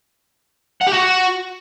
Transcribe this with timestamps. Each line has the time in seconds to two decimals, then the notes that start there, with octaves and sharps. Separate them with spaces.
0.81 F#5
0.87 G4
0.93 F#4